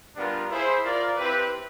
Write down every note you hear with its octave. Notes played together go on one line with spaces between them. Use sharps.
G3 B3 D4 F4 A#4
E4 G#4 C5
F4 A#4 D5
C4 E4 G4 B4